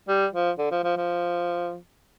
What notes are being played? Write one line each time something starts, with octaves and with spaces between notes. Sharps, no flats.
G3
F3
D3
F3
F3
F3